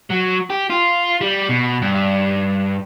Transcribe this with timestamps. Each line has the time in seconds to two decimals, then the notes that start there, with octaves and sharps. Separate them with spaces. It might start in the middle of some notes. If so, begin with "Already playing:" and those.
0.11 F#3
0.50 G4
0.70 F4
1.21 G3
1.49 B2
1.82 G2